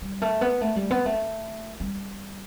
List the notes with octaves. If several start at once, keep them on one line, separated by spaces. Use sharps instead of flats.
G3
A3
B3
A3
G3
B3
A3
G3